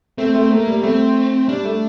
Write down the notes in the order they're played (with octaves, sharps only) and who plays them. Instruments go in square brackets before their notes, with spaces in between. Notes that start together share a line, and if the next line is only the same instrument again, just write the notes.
[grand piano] A3 [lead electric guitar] C4
[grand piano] A3
[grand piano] A3 [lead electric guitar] A#3
[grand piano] G3
[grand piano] A3 [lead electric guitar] C4
[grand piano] G3 [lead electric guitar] D4
[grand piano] A3